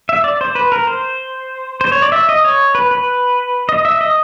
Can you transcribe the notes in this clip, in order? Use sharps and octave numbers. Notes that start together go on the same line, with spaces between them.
E5
D5
C5
B4
A#4
C5
C5
C#5
D5
E5
D#5
C#5
B4
B4
D#5
E5
D#5